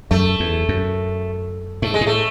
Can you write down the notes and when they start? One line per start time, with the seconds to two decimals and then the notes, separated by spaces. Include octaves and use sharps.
0.11 F#2 A3
0.40 E2
0.69 F#2
1.82 G#2 A3
1.94 G#3
2.01 A2
2.07 A3